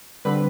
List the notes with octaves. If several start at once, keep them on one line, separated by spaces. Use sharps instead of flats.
D3 G3 C4 B4